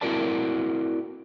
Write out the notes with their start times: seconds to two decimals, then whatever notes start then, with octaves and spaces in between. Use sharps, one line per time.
0.01 C4 E4 F#4 A#4 D5 A5